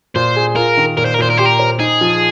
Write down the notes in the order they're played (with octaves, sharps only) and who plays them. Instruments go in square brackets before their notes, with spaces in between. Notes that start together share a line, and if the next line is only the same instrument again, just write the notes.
[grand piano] A#2 [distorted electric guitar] C5
[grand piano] G#4
[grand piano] F4 [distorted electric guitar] A#4
[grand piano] D#3
[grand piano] A#2 [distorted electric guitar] A#4
[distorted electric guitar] C5
A#4
[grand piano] A#2 [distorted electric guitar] C5
[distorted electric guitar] A#4
[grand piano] G4 [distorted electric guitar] C5
[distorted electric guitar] A#4
[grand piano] C5
[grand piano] D#4 [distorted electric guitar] G#4
[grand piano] F3